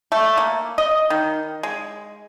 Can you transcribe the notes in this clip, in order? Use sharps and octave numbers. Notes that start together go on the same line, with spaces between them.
A3
A#3
D#5
D#3
G#3